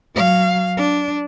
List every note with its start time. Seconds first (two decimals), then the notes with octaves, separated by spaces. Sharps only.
0.15 F#3 F5
0.77 D4